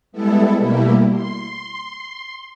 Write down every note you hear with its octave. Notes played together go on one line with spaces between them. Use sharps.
G3 G#3 B3 E4 A4
B2 G3 A3 A#3 E4
C6